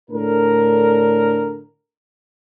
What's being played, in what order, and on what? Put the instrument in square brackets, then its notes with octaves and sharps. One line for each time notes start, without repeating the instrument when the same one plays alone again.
[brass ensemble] A2 D3 D4 A#4